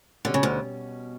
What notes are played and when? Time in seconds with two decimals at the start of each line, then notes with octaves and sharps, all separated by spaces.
0.25 B2 D3 G3 C#4
0.34 C#3
0.43 D2 D3